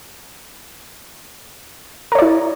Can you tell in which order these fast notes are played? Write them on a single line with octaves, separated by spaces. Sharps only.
A#4 C#5 D5 E4